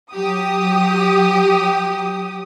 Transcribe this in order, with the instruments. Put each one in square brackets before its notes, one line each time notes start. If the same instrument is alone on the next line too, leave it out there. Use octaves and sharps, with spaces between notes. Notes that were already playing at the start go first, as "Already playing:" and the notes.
[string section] F#3 G4 D#6